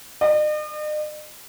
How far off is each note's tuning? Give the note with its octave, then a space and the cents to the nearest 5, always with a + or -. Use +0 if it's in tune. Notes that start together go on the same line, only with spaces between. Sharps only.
D#5 -45